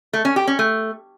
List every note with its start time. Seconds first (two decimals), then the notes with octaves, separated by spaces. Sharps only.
0.13 A3
0.25 C#4
0.36 G4
0.47 C#4
0.59 A3